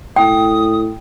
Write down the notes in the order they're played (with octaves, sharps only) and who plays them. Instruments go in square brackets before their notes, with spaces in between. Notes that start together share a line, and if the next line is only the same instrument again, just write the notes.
[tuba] A2 [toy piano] G5 [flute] D#6